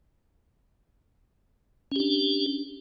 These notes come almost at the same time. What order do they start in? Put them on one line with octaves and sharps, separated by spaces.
C#4 G4 D4